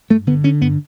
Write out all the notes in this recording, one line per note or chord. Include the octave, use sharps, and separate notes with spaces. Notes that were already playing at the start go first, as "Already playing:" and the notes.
G2 A3
D3 B3
D3 C#4
G2 B3